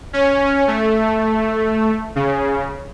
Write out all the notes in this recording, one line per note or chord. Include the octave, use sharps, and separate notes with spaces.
C#4
A3
C#3